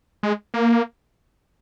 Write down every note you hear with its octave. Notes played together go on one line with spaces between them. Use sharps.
G#3
A#3